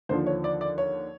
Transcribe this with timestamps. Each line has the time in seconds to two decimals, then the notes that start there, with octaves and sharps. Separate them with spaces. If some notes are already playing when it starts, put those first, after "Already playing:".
0.09 D#2 D3 F3 C5
0.27 C#5
0.44 D5
0.61 D5
0.78 C#5